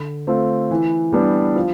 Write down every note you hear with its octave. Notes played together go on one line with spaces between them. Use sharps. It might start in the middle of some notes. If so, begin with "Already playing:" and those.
Already playing: D3
A3 C4 F4
E3
G3 B3 D4 G4
F3